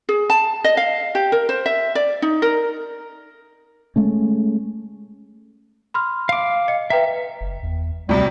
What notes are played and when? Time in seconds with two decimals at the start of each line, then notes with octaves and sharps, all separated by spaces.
0.09 G#4
0.30 A5
0.64 D#5
0.77 F5
1.15 G4
1.32 A#4
1.49 C5
1.66 E5
1.95 D5
2.22 D#4
2.42 A#4
3.96 G#3 A3 C#4
5.94 B5 C6 F6
6.29 F5 D6
6.68 D#5 C#7
6.90 B4 E5 G5 A#5
7.41 F#1
7.63 E2
8.09 D2 A2 C3 F#3 G3